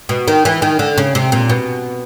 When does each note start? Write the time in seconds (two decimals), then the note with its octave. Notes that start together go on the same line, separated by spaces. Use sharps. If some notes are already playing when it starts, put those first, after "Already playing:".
0.09 B2
0.28 D#3
0.45 E3
0.62 D#3
0.79 D3
0.98 C#3
1.15 C3
1.32 A#2
1.50 B2